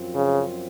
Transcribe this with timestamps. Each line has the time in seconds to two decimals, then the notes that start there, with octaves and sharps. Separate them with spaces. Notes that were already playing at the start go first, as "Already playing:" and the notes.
Already playing: F#2 F3 C4 F4
0.15 C#3